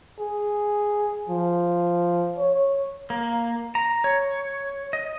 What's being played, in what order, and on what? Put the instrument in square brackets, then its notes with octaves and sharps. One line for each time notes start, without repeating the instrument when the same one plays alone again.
[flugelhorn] G#4
F3
C#5
[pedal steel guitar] A#3
A#5
C#5
D#5